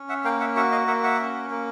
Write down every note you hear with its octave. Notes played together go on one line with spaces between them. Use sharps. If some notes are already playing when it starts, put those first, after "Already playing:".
Already playing: C#4
E5 F#5
A#3 F5 G5
E5 F#5
F#4 E5 F#5
D#5 F5
A#3 E5 F#5
E5 F#5
C#4
A#3